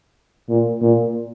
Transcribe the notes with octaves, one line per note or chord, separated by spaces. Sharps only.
A#2
A#2